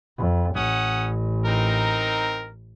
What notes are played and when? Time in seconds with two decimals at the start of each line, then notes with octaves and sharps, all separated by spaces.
0.18 F2
0.55 A1 C#4 F#5 D#6
1.46 C4 D#4 A#4